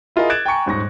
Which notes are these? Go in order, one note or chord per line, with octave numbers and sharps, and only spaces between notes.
E4 F4 G#4 A#4 D#5
F#6 G#6 A6 D7 E7
G5 G#5 A#5 C#6 C#7
D#1 G#2 C#6 A#6